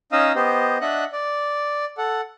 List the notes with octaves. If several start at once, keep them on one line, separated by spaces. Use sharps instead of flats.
C#4 D#4 D#5 F5 D#6 E6
B3 G4 C5 D#5
D4 D#5 E5 F#5 F#6
D5
A4 F#5